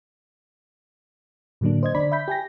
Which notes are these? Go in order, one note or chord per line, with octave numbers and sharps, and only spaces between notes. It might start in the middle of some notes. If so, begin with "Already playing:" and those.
A2 D3 F#3 A#3 D4
C5 D#5 G#6
D3 D4 D5 B5 B6
E5 B5 G6 B6
G4 G#5 A#6